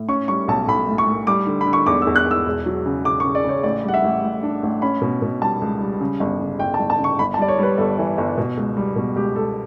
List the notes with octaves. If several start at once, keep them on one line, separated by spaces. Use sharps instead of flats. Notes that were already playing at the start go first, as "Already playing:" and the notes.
Already playing: A2
C#4 C#6
G3 C#6
B1 A5
B1 B5
A2
C#6
A2
G3 D6
D3
B5
D3
C#6
E2 D6
E6
E2
F#6
E2 E6
E1
F#3
C#3
C#3 D6
C#6
C#3
D5
C#3 C#5
A1 D5
G3 F#5
E5
A1
A2
D4
A1
C#4 B5
B2
B2
G3 A5
C#2
G3
C#3
G1
C#3
G1 G5
A5
G1
A5
C#3
C#6
G1 B5
A5
G3 D5
C#5
G3 B4
G1 A4
E3
G1
B2
C#2
G3
B2
C#2 G4
C#2 A4